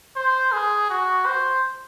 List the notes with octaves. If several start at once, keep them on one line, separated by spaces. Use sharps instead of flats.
C5
G#4
F#4
C5